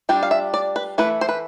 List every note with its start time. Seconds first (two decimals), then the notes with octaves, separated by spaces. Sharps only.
0.09 G3 D4 F4 G5
0.23 F5
0.31 E5
0.54 D5
0.76 B4
0.98 E3 A3 E4 B4
1.21 C5
1.29 B4